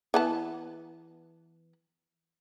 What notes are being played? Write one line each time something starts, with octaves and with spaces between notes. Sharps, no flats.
E3 B3 A5